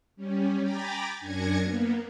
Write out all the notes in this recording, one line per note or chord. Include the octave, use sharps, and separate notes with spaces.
G3 C#4
G5 G#5 A#5 B5 D6 A6
F#2 D4 G#5 G#6 A#6 C#7
A#3 B3